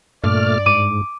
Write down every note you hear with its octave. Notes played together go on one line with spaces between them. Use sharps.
G2 A#2 A3 D5 F6
G#2 D6 D#7